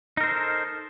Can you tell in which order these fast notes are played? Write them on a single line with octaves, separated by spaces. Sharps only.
D#4 A#4 C5 A4